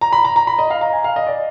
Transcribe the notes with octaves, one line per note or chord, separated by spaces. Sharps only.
A#5
B5
A#5
A#5
B5
D#5
F5
A#5
G#5
F5
D#5
D5